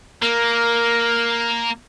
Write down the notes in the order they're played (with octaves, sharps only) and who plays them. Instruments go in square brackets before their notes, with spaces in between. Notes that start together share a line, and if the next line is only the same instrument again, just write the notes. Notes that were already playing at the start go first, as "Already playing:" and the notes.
[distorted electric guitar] A#3 [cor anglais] A#4